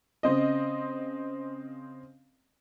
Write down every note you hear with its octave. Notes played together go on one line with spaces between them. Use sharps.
C#3 C4 D#5